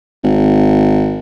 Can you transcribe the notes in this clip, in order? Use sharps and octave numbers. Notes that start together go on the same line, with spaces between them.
G#1